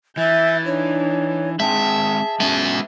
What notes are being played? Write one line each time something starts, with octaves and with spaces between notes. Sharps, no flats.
E3 E5 G6 A6
D4 D#4 C#5
G#3 C4 G#4 E5 G5 A5
G#3 B3 C#4 F#4 E5